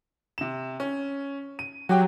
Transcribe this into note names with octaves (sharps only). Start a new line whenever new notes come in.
C3 E7
C#4
D#7
F#3 F#4 G4 G5